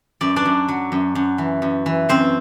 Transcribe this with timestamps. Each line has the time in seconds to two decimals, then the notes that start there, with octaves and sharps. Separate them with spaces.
0.21 F#2 D5
0.36 D4 D5
0.45 F#2
0.68 F#3
0.92 F#2
1.15 F#2
1.38 E3
1.62 F#2
1.86 E3
2.09 F#2 C4 C5